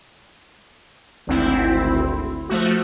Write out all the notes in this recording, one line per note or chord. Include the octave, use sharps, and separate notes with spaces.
G#1 D2 C4 E4
F3 A3 F#4